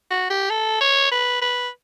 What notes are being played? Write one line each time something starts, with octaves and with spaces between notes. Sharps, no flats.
F#4
G4
A4
C#5
B4
B4